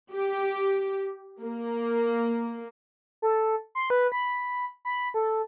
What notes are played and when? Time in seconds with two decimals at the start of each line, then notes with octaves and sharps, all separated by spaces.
0.13 G4
1.42 A#3
3.22 A4
3.75 C6
3.90 B4
4.12 B5
4.85 B5
5.14 A4